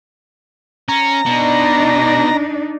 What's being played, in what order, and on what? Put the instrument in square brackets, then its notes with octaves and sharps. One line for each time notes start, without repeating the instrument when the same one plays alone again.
[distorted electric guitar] C#4 [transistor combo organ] A#5
[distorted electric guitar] B2 [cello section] D4 D#4